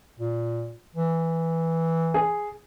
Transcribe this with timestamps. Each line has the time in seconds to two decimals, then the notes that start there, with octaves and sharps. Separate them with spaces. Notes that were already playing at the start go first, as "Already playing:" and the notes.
0.19 A#2
0.95 E3
2.14 G#4